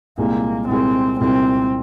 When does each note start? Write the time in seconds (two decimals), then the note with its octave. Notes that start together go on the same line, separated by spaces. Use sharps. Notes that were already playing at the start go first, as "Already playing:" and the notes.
0.18 C2 A#2 G#3 A#3
0.68 C2 A#2 G#3 C4
1.19 C2 A#2 G#3 C4